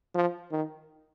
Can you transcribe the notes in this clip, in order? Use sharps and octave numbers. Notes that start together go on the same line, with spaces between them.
F3
D#3